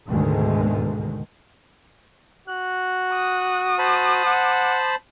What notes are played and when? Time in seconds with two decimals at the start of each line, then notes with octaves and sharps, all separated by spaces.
0.10 D2 G#2 B2 D3 D#3 G#3
2.48 F#4 F#6
3.13 D#6
3.79 C5 A5 B5
4.26 F#5